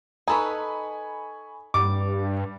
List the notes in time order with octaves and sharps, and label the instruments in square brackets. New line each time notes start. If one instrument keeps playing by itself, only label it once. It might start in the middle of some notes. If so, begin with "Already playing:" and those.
[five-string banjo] D#4 A4 B4 [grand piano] G#5 B5 C#6
[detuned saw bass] G2 [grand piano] G3 [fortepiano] D6